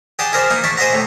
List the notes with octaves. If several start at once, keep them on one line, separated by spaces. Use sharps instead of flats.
G4 G#4 D5 F#5 G5 A5
E4 G#4 A#4 C5 D5 E5
A#3 D#4 E4
D4 E4 D5 E5 C#6
G#4 C5 D#5 E5 F#5 A#5
A2 C3